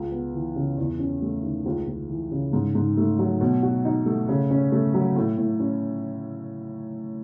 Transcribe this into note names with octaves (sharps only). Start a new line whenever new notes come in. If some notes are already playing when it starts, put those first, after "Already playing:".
Already playing: C#2
B3
E3
C#3
E2
C#4
A3
D#3
C#2
C#2
E3
C#3
G#2
G#2
A3
F#3
B2
F#4
D#4
A3
C#3
C#4
A3
F#3
A2
A2
C#4